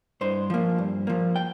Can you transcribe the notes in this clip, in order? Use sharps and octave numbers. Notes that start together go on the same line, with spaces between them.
G2 C5
F3 A#3
G2
F3 A#3
G5